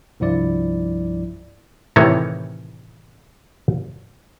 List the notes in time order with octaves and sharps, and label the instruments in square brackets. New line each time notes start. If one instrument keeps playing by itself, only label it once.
[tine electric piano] C2 G2 F3 E4 D5
[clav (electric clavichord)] A2 C3 D#3 E3 C#5